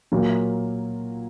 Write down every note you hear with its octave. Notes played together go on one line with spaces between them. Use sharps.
A#2 F#3 A#3